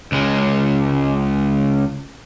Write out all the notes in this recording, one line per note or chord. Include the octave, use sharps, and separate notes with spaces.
C#2 G#3